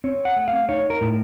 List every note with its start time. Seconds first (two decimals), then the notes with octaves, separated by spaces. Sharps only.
0.04 C4 C#5
0.25 F#5
0.36 A3
0.48 F5
0.69 D#4 C#5
0.90 A#4
1.01 A2